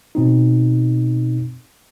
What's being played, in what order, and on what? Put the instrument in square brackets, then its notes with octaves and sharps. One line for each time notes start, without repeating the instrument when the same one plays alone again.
[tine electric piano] B2 C4 D#4